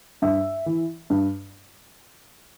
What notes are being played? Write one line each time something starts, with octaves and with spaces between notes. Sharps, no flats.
G2 E5
E3
G2